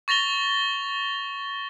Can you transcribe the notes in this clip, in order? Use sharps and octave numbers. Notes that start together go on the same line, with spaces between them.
C#6 A6 A#6 F7 G7